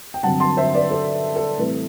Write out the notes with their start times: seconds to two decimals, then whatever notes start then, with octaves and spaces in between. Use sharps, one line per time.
0.14 G5
0.23 G2 D3 F#3 C4 F#5 A5
0.40 A5 C6
0.57 C5 E5
0.74 B4 D5
0.91 A4 C5
1.36 A4
1.58 A2 E3 G3 C4 B4